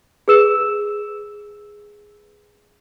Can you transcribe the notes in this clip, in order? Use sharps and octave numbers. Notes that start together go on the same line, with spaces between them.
G#4 B4 E6 E7